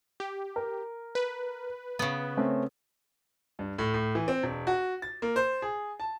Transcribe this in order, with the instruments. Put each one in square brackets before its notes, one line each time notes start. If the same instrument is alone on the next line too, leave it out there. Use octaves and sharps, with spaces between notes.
[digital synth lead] G4
[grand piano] A#4
[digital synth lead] B4
[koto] C#3 B3
[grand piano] A3 C4 C#4
G2
A2
A2
E3
C4
E1
F#4
A6
A#3
C5
G#4
A5